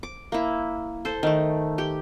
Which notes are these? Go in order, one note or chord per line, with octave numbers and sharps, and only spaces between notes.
D6
A#3 E4
A4 C5
D#3 A3
G4